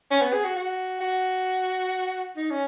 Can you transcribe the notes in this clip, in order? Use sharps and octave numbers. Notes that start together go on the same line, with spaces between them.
C#4
B3
G#4
F#4
F#4
F#4
D#4
C#4